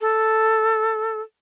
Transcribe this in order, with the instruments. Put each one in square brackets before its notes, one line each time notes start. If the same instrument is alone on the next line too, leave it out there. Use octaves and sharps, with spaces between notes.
[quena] A4